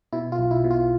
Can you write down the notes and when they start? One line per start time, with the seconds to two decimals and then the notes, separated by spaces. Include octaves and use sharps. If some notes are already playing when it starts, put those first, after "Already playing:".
0.13 B2 E4
0.32 F4
0.38 B1
0.51 E4
0.64 B2
0.71 F4